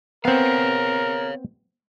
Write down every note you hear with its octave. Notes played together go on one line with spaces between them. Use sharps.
B3 C4 A#4 C#5 F5